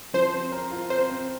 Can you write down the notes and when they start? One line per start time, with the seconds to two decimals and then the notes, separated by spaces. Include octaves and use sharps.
0.14 F3 C5
0.33 C4
0.52 A#4
0.71 F4
0.90 C4 C5
1.10 C4